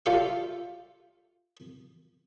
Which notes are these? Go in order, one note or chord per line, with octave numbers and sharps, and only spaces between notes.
F4 G4 A4 D5 E5 F5